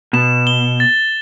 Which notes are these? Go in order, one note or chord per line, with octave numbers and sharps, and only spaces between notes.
B2 E7
G7
A6